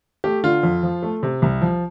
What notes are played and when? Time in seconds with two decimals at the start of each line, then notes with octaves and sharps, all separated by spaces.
0.24 A3 G4
0.43 D3 F4
0.63 F2
0.83 F3
1.03 A3
1.23 C3
1.42 C2
1.62 F3